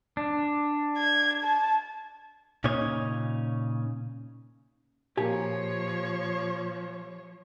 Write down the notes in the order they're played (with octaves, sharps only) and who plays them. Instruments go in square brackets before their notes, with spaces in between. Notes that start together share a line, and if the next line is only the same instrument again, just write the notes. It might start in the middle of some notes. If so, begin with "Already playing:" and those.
[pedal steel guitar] D4
[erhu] G#6
A5
[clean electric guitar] A#2 C#3 C#4 D#4 C#5
[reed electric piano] A#2 A#3 [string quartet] F3 [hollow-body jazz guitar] G4 G#5 [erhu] C#5